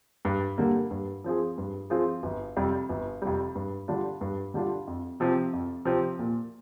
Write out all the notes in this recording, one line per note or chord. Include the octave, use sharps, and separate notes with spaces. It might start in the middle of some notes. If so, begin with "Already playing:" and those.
G2
D3 G3 A#3
G2
F3 C4 F4 G#4
G2
F3 C4 F4 G#4
G1
F2 C3 G3
G1
F2 C3 G3
G2
D3 G3 D4 F4
G2
D3 G3 D4 F4
F2
C3 F3 C4 G4
F2
C3 F3 C4 G4
A#2